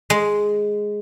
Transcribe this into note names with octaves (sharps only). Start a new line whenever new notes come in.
G#3